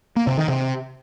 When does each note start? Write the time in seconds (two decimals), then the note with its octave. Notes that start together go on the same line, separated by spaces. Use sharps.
0.16 A#3
0.27 C3
0.38 D#3
0.48 C3